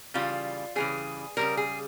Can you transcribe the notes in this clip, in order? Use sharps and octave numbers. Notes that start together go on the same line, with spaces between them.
C#3 E3 G3 F4
C#3 E3 G3 G#4
C#3 E3 G3 A#4
G#4